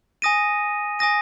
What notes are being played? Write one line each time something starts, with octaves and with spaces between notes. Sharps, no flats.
G#5 D#6 A#6 D#7
G#5 D#6 A#6 D#7